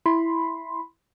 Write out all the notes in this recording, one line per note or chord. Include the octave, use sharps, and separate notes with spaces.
E4 B5 C6